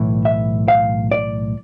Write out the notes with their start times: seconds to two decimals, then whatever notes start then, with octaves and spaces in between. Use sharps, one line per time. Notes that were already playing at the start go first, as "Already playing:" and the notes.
Already playing: B1 A2 E3
0.25 E5
0.68 F5
1.11 D5